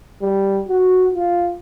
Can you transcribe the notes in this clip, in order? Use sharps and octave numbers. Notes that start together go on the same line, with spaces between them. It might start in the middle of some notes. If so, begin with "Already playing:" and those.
G3
F#4
F4